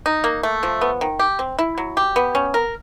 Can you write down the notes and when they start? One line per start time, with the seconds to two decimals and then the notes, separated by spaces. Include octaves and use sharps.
0.06 D#4
0.24 A#3
0.43 A3
0.63 F3
0.81 B3
1.01 D#3
1.19 G4
1.39 C4
1.59 E4
1.78 F#3
1.97 G4
2.16 B3
2.35 C#4
2.54 A#4